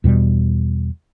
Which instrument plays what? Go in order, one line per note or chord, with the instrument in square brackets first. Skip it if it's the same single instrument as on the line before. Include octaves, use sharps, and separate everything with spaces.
[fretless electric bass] E2 B2 G3